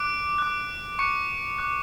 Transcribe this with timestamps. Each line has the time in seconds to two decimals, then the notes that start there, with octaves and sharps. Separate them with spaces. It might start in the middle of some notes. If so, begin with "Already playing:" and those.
Already playing: D6 F#6 D7
0.38 D6 F#6
0.99 C#6 D6 F#6 C#7
1.58 D6 F#6